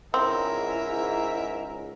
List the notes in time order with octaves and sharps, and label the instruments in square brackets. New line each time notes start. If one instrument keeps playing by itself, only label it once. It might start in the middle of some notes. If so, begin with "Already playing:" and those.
[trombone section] C#2 G#2 [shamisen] C4 [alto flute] E4 [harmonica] A#4 E5